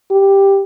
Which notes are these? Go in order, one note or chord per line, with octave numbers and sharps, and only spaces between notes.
G4